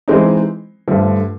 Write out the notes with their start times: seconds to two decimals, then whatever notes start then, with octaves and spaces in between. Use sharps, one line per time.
0.08 E3 G#3 C4 D#4
0.88 G2 D3 F3 A3